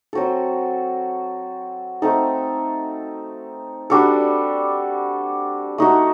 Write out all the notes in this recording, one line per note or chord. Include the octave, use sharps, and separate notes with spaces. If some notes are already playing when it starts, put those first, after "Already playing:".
F#3 C4 F#4 A4
A3 C4 D#4 A4
G3 D4 F#4 A4
A3 D#4 F#4